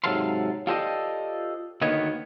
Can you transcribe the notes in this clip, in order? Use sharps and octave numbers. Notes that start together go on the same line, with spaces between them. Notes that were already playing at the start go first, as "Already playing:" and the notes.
G#2 C3 F#3 A4 F5 C6
F4 G4 A4 C5 D5 D#5
D2 D#3 A#3 B3 C#5 D#5